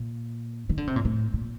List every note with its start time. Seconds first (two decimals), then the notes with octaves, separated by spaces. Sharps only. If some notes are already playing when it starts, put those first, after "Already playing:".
Already playing: A#2
0.69 D#3
0.78 D3
0.87 C3
0.96 A#2
1.05 A2
1.34 A#2